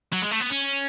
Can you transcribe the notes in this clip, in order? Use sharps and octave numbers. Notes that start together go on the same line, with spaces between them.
F#3
G#3
A3
B3
C#4